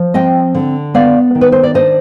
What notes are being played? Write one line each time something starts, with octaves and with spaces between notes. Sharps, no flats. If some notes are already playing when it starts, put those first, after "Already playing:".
Already playing: F3
C4 D#5 G5
D3
B3 D5 F5
D#3
B4
C5
D5
D4 C5 D#5